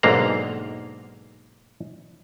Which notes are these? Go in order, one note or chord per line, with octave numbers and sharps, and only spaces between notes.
B1 G#2 D3 A#3 F5 A#5